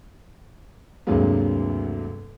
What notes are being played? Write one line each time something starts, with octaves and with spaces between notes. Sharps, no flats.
D2 G2 C3 F#3 G#3 A#3